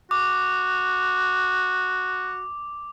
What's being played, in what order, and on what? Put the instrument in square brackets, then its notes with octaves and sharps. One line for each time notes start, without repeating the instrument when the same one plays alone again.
[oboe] F#4 [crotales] D6